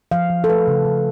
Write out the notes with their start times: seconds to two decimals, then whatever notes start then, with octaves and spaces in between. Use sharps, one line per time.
0.11 F3 F5
0.30 F3
0.44 A4
0.49 A3 B4
0.67 C#3
0.85 C#3